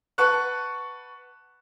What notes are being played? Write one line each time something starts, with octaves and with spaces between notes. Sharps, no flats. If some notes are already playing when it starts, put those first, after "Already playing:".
B4 F#5 A5 C#6 F#6